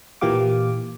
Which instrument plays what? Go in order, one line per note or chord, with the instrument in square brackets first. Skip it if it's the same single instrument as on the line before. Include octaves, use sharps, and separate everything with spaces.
[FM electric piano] A#2 E3 A#3 G4 F5 D6